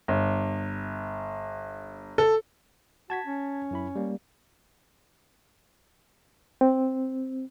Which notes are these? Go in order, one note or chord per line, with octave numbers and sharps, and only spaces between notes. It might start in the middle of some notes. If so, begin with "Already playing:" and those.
G1
A4
F#4 A5 G#6 B6
C#4
F#2 E4 B5
G3 A#3
C4